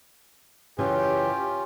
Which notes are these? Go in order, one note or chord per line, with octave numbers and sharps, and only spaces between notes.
F#2 C#3 E3 C#4 F4 G4